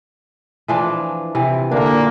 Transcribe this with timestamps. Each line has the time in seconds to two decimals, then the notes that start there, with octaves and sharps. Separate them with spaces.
0.68 E3 F3 D4
1.35 C3 E3
1.71 A#2 D3 A#3 D4